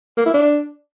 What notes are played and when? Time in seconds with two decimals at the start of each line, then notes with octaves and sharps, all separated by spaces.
0.17 A#3
0.26 E4
0.34 D4